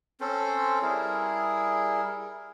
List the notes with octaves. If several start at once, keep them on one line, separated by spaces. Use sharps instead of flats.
C4 C#4 A4 C5
G3 E4 G#4 A#4